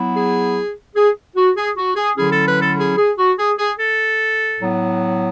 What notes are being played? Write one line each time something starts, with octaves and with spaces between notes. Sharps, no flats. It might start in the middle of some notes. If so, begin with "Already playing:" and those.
Already playing: F#3 B3 E4
G#4
G#4
F#4
G#4
F#4
G#4
D3 F#3 C#4 E4 G#4
A4
B4
A4
G#4
G#4
F#4
G#4
G#4
A4
A2 F#3 B3